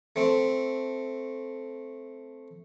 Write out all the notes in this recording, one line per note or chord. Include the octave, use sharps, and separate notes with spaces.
A3 C4